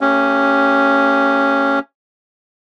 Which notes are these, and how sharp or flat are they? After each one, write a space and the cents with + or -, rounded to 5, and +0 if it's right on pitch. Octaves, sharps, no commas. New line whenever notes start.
A3 +45 C#4 +0 G4 +0